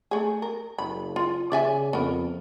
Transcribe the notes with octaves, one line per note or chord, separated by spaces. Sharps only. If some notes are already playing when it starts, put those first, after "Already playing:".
A3 G#4
A#4
F#1 B5
F4
C#3 D5 E5 G#5
F2 B3 A#4